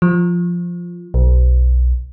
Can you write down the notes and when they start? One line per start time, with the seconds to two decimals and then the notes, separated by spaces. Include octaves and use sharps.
0.02 F3
1.14 B1